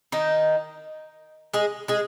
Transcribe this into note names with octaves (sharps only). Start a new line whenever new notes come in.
D#3 D#4
G#3 G#4
G#3 G#4